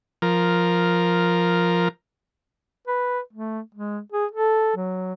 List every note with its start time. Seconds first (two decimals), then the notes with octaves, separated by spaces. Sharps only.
0.22 F3 A#4
2.87 B4
3.33 A3
3.75 G#3
4.12 G#4
4.32 A4
4.76 F#3